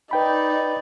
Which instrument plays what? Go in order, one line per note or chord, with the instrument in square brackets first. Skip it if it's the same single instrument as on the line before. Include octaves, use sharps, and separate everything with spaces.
[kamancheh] D#4 D5 [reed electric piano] B4 G5 B5